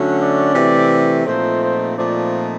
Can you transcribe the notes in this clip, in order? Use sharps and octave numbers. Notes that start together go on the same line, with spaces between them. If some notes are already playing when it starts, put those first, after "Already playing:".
Already playing: D3 F#3 A3 C#4
D5
C3 E3 A3
A#2 F3 A3 C4 D#4 C5
C5
A#2 F3 A3 C4 D#4 D5